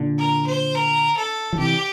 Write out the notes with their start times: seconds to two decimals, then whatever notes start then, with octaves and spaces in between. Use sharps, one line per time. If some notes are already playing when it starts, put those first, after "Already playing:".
Already playing: A#2 D3
0.18 A#4
0.46 C5
0.74 A#4
1.17 A4
1.53 F3
1.58 C3 E3 G4